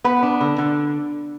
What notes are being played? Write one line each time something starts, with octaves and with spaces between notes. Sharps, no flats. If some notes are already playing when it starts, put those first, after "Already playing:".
B3 B4
D4
D3
D3